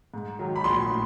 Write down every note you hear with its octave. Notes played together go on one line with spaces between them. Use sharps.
G#2
D#3 F#3
B5
A#1 C6
A2